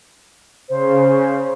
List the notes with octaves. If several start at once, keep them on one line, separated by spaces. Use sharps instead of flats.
C#3 C5